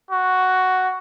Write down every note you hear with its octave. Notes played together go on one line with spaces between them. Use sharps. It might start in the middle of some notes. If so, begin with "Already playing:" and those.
F#4